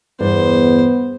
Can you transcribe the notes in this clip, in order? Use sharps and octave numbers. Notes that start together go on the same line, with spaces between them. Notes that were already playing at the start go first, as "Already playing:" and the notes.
E2 G2 B3 C5